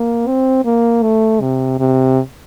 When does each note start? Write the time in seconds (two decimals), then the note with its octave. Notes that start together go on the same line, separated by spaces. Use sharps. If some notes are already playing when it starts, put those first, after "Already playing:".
Already playing: A#3
0.27 C4
0.65 A#3
1.02 A3
1.41 C3
1.79 C3